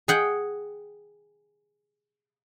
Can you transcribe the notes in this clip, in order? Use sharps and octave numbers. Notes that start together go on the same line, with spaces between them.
G#4 F#5 G5